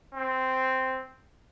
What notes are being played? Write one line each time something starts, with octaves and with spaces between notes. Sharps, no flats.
C4